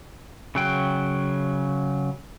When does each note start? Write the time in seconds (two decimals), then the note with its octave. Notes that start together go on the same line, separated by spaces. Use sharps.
0.55 C#3 F#3 G5